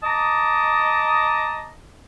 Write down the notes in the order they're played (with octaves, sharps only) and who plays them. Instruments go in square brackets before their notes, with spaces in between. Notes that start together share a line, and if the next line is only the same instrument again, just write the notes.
[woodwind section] D#5 A5 A#5 D6 D#6